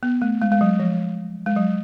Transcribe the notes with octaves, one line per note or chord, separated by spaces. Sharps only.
B3
A3
G#3
G#3
F#3
F3
G#3
F#3